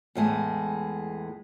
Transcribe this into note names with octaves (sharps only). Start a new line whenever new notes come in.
E2 A2 G#3